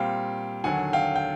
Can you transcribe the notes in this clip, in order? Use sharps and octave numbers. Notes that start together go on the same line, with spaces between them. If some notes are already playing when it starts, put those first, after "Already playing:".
Already playing: A#2 G3 C4 F5 G5
D#2 D3 F#3 F#5 G#5
F5 G5
G5